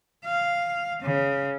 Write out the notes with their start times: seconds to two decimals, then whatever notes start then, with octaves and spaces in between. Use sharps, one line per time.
0.25 F5
1.03 C#3